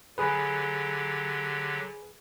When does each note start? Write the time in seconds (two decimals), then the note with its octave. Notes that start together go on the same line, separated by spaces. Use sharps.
0.18 D3 F#3 G4 G#4 B4